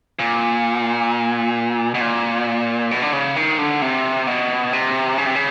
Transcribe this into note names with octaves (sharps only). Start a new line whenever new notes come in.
A#2
B2
A#2
B2
D3
C#3
D#3
D3
C3
B2
C3
C#3
C3
C#3